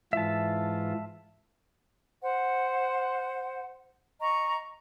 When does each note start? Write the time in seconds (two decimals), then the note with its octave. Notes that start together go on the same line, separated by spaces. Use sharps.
0.13 G#2 E3 F4 E5 A5
2.22 C5 F#5
4.20 D#5 A#5 C#6